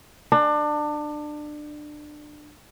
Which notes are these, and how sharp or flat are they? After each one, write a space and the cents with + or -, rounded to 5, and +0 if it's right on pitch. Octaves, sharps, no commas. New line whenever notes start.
D4 +25